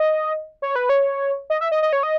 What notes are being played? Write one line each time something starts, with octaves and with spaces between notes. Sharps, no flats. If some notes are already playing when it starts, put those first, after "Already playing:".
Already playing: D#5
C#5
B4
C#5
D#5
E5
D#5
D#5
C#5
D#5